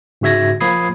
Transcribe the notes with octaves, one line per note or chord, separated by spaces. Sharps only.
G#2 C#3 F#4 E5 G#6 A#6
F3 A#3 B5 D#6 G#6 C7